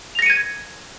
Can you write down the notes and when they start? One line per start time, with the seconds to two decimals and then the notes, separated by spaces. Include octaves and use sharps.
0.15 F7
0.19 A#6
0.22 C#7
0.26 D#7
0.30 G#6